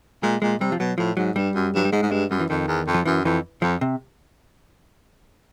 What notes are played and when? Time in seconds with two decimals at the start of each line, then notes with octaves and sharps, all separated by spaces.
0.23 A#2 G#3
0.42 A#2 G#3
0.61 C3 G3
0.72 F3
0.79 B2 F#3
0.98 A2 F3
1.17 G#2 F#3
1.36 G2 G3
1.55 F#2
1.74 G2 F#3
1.85 G3
1.92 G#2 G#3
2.03 G#2
2.11 G2 G#3
2.31 F#2 G3
2.40 E3
2.49 F2 D#3
2.68 E2
2.87 F2
2.94 F3
3.05 F#2 E3
3.25 F2 E3
3.62 F2 F3
3.81 C3